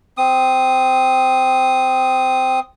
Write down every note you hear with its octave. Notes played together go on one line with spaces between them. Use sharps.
C4 D#6